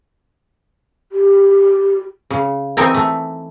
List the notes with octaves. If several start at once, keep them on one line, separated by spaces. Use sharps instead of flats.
G4
C#3
E3 C4 D#4 A#4 G#5
A3